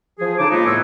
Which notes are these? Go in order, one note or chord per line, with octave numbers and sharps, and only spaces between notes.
F3 G#4
C#3 D#4 A4 A5 D6
F3 G#3 A#3 B3 D#4 F4
E2 A2 B3 B4 C#5 E6